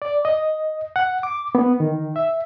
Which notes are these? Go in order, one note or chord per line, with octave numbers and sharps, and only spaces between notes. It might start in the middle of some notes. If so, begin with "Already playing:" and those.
D5
D#5
F#5
D6
B3
D#3
E5